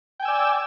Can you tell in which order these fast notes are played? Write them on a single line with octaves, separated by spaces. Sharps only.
G5 G#5 E6 D5